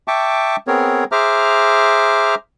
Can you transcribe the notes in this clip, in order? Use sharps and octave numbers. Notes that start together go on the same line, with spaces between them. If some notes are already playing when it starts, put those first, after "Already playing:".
E5 G5 A5 C#6 D6
B3 C4 G#4 A#4 C#5
G#4 C5 E5 A#5 D6 F6